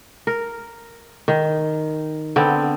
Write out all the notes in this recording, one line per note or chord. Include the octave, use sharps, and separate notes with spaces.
A#4
D#3
D3 B3 C4